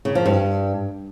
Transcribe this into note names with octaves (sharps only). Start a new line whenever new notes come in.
C#3
F3
G2